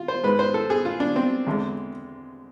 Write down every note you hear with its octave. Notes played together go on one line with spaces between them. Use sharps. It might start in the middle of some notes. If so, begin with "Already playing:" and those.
Already playing: F4
C5
G#2 G#3 B4
C5
A4
G#4
F4
D4
C4
E2 D3 G#3